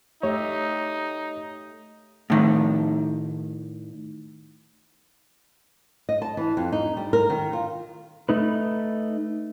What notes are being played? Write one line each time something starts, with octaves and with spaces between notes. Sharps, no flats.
A3 D#4 G4 C#5 E5
A2 D#3
D#5
A5
E3
F2
D#4
G3
A#4
D#3
F4
A3 D#4 B4